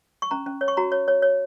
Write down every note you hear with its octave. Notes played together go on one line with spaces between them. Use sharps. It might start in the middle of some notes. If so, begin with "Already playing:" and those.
C#6
C#4 A#5
C#4
C#5
C#6
F#4 A#5
C#5
C#5
C#5